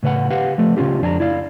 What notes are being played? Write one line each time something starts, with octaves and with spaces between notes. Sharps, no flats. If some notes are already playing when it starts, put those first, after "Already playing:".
A2 C#3 B4 C#5 F#5
G4 B4 F5 F#5
F3 A3
C#3 F3 C#4 F4 G4
F2 D4 G#5 A#5
E4 D5 F5